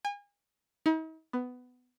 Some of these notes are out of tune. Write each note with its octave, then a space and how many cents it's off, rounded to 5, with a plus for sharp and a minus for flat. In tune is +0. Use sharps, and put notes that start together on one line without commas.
G#5 -35
D#4 +45
B3 +15